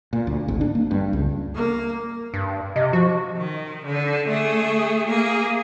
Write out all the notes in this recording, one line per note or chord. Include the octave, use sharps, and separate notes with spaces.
A#2
D2
G#1
D4
A#3
G2
C#2
A#3
G2
C3 D#5
F3 F#4
D#3
D3
A3 G#4
A#3 G#4